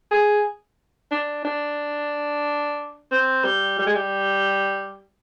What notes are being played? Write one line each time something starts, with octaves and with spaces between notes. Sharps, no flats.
G#4
D4
D4
C4
G3
G3
G#3
G3